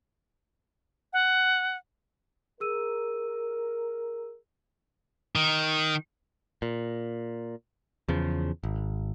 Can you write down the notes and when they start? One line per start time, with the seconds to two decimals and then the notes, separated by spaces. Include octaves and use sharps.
1.13 F#5
2.60 G#4 A#4 E6 D#7
5.36 D#3
6.62 A#2
8.08 E2 C#3 F3
8.63 G#1